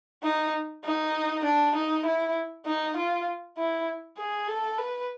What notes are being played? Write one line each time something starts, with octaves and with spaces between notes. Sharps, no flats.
D#4
D#4
D4
D#4
E4
D#4
F4
E4
G#4
A4
B4